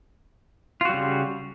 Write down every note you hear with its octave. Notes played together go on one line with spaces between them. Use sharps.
C#3 G3 F4 F#4